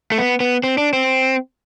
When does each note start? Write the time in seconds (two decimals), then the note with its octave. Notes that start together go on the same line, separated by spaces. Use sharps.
0.12 A3
0.18 B3
0.40 B3
0.63 C4
0.78 D4
0.93 C4